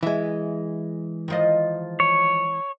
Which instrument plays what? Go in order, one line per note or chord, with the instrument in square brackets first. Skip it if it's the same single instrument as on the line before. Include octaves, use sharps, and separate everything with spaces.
[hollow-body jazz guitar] E3 G#3 [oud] E5
[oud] D#3 F3 D#5
[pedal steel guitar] C#5